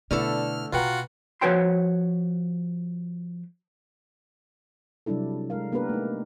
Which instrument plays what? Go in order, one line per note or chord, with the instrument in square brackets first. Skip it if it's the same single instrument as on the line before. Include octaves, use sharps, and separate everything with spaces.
[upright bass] B2 [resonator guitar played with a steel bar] D3 A3 A4 [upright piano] B3 E4 D5 [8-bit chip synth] F6
[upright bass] B2 A#3 [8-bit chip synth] F4 F#4 F#5 [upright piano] B4 G5 A#5
[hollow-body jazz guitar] F3 F#4 B4 C#5 G5 C6
[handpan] C3 F#3 G3 D4 E4 A4
G#3 D4 A#4 F5
A#3 B3 D4 G4 A#4 B4
A3 D#4